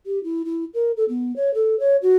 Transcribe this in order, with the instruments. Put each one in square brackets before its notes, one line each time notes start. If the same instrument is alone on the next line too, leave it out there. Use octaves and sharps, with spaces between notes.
[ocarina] G4
E4
E4
A#4
A4
B3
C#5
A4
C#5
F#4